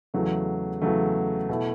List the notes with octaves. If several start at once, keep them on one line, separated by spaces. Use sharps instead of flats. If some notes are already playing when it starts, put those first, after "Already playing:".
E2 C#3 F#3 A3
E2 C#3 F#3 A3
B2 A3 E4